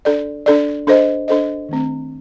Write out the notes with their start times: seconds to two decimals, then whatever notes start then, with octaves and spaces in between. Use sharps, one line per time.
0.05 D4 A4 D5
0.46 D4 A4 D5
0.87 D4 A4 C5 D#5
1.28 D4 A4 C5 D#5
1.69 D#3 A3 C4